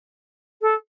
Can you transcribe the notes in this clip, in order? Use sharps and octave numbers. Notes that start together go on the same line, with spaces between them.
A4